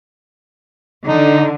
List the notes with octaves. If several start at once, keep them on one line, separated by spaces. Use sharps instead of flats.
D3 D#4